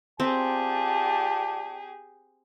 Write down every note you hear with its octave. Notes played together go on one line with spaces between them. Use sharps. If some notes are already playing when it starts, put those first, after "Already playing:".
C4 F4 G4 G#4 D5 A5